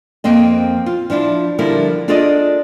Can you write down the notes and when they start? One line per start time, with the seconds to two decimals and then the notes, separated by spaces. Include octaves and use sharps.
0.24 F2 A#3 C4 D#5
0.86 F4
1.10 F3 D4 E4 F4
1.58 D3 F3 G3 E4 A#4
2.08 D4 F4 G#4 A4 D5 D#5